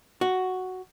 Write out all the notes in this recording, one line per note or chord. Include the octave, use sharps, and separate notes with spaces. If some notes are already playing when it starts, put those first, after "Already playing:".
F#4